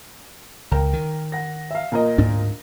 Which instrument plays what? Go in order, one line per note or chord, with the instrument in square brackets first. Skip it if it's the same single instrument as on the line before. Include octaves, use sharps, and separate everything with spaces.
[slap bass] C#2 [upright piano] A#4 G5
[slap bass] D#3
[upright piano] F#5 A#6
E5 F5
A#2 A#4 D#5
[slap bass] D2 G#2 D4